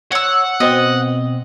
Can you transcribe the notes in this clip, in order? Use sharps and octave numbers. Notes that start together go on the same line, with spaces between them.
C#5 F#5 E6
B2 C4 D#5